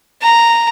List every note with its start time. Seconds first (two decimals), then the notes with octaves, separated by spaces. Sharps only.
0.22 A#5